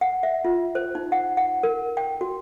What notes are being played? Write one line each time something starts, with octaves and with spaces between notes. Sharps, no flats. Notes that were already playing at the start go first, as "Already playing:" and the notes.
F#5
E5
F4
C5
D#4
F#5
F#5
A#4
G5
F#4